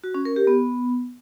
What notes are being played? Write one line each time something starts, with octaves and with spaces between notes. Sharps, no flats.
F#4
C#4
A#4
G4
B3